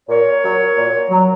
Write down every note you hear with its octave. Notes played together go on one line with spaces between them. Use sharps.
A#2 A#4 C#5
F#3
A#2
F#3